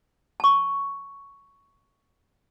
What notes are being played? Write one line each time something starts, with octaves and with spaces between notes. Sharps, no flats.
A5 C#6